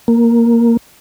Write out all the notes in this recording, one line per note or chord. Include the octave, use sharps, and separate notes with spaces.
A#3